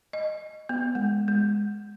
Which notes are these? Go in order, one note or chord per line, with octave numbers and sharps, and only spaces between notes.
D#5
B3
G#3
G#3